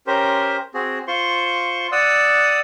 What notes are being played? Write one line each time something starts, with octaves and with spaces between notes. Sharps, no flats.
C#4 G4 A#4 C5
C4 F#4 G#4
F4 C5 C6 C#6
D5 F#5 D#6 E6